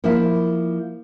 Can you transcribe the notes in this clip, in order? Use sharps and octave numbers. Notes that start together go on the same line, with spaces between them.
F3 A#3 E4